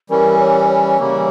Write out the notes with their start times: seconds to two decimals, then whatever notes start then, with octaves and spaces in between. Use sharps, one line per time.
0.10 E3 G3 C#4 A#4
0.39 C#5
0.70 C#5
0.98 C#3 E3 G3 A#3